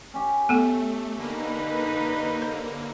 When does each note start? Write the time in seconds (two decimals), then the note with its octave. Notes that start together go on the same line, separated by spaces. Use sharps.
0.14 C#4 G4
0.49 A3 B3 A4
1.18 D3 A#3 D#4 B4
2.42 C5